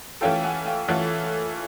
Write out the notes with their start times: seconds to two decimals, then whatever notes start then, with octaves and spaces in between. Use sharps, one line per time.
0.21 E3 A3 C#4 F4 A4 F5 G5
0.43 F#5 G#5
0.65 F5 G5
0.88 E3 A3 C#4 F4 A4 E5 F#5